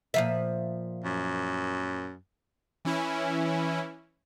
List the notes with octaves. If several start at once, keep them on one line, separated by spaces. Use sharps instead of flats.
A#2 F3 E5
F#2
E3 C#4 E4